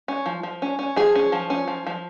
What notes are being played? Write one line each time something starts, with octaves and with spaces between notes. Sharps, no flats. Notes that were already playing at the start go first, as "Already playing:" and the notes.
C#4
F3
F3
C#4
C#4
F3 G#4
C#4
F3
C#4
F3
F3